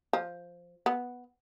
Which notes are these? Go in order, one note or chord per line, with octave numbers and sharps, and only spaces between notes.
F3
B3